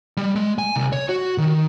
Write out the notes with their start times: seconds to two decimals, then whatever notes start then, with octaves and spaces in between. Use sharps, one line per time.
0.17 G3
0.36 G#3
0.58 G#5
0.76 C2
0.92 C#5
1.09 F#4
1.38 D#3